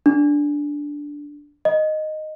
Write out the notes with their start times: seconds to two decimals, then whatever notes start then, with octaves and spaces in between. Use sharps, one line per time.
0.06 D4
1.65 D#5